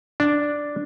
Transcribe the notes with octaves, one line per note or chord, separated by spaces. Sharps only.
D4